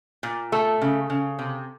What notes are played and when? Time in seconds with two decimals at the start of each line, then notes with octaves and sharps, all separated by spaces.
0.23 A#2
0.52 A3 A4
0.82 C#3
1.10 C#3
1.39 C3